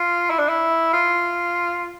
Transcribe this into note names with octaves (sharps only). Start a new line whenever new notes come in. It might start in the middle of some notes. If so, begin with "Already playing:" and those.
Already playing: F4
E4
D4
E4
F4